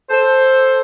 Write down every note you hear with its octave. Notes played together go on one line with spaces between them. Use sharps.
A4 C5